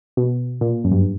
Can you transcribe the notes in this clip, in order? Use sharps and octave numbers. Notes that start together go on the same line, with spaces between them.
B2
A#2
F#2
G2